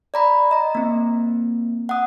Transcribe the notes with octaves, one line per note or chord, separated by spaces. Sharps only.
D5 A#5 B5
D#5 A#5
A#3 C4
F#5 D#6